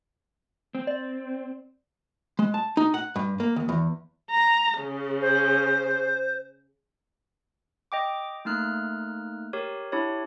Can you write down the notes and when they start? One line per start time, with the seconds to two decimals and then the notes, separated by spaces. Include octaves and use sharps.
0.75 C4
0.87 D5
2.39 G#3
2.54 A5
2.77 D#4
2.94 F#5
3.16 G2
3.40 A#3
3.56 D#2
3.69 E2
4.31 A#5
4.79 C#3
5.22 C5
7.92 D#5 G5 D6
8.45 A3 A#3 D#4 F6 F#6
9.53 G4 A#4 C#5
9.92 D4 E4 G4 C#5